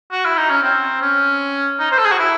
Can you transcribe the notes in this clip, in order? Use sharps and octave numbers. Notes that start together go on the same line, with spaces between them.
F#4
E4
D#4
C#4
C4
C#4
D#4
C5
A4
G#4
F#4
E4